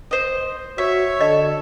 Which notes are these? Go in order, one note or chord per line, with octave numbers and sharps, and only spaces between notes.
C5 D#5
F#4 C#5 E5
D3 A4 D#5